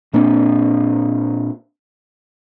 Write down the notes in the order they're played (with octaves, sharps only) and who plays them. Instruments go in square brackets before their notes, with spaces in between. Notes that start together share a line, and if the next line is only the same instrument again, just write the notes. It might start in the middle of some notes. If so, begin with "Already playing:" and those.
[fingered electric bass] A#2 A#3 C4 D4